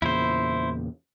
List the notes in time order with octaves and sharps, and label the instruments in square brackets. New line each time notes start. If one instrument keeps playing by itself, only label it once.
[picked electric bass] E2 A#2 C#3 [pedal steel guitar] E4 C5